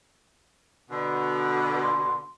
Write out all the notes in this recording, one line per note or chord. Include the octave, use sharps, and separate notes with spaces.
B2 D3
C6